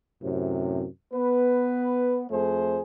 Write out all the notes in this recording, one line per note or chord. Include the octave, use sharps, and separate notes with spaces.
F#2 A2 C3
B3 B4
F2 A3 G#4 C5